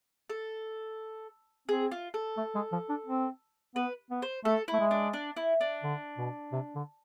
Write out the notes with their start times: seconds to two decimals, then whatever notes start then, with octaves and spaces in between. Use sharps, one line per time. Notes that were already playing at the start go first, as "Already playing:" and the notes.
0.29 A4
1.68 C4 G#4
1.91 F4
2.14 A4
2.37 A3
2.55 G#3
2.72 F3
2.89 D4
3.06 C4
3.75 B3 B4
4.10 B3
4.22 C5
4.45 A3 A4
4.68 E4
4.73 A3
4.79 G#3
4.91 D4
5.13 D4
5.36 E4
5.61 D4
5.83 D3
6.18 B2
6.52 C3
6.75 D3